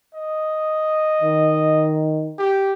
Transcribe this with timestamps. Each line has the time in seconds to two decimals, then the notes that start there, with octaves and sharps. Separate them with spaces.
0.14 D#5
1.22 D#3
2.39 G4